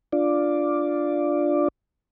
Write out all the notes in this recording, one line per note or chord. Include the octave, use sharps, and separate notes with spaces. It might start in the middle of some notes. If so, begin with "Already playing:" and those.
D4 F4 D5